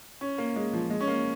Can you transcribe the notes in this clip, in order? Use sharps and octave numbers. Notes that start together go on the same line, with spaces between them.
C#4
A#3
G#3
F3
G#3
C#4
A#3